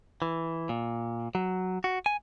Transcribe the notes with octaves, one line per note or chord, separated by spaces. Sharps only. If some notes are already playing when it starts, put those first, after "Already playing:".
E3
A#2
F#3
F#4
G#5